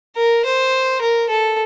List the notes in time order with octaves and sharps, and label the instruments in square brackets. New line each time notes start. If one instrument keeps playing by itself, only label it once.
[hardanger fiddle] A#4
C5
A#4
A4